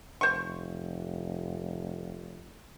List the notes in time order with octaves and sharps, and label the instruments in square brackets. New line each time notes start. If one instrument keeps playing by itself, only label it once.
[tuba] F1 [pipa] C5 C#6